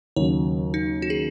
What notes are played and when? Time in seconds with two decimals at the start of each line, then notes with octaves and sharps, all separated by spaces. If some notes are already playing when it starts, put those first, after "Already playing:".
0.16 D#2 C#3 F#3 C#5
0.74 D#4
1.02 F#4
1.10 G#4